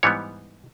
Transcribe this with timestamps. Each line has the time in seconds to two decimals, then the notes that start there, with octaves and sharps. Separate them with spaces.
0.03 G#2 E3 G3 B3 C#5